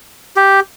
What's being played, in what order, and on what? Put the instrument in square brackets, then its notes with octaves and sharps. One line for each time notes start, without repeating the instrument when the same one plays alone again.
[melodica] G4